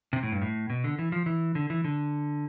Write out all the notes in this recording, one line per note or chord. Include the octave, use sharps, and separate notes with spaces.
C3
A2
G2
A2
B2
D3
E3
F3
E3
D3
E3
D3